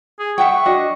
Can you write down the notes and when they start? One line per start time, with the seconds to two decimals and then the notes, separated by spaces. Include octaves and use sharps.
0.19 G#4
0.38 E5 F#5 G5 C#6
0.66 D4 F#4 D#5